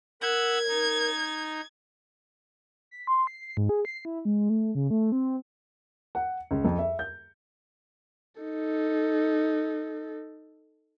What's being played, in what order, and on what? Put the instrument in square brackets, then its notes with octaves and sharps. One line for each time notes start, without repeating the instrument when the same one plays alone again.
[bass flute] A#4 [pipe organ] F#5 B5 E6 [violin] G#6
[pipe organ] D#4
[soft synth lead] B6
C6
C7
G#2
G#4
C7
E4
G#3
A3
C#3
A3
C4
[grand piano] F#5
C#2
F2
E5
G6
[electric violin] D#4 A4